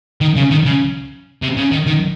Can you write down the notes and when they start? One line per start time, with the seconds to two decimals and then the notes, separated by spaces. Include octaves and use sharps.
0.21 D#3
0.36 C#3
0.51 D#3
0.66 C#3
1.42 C3
1.57 C#3
1.72 D#3
1.87 D#3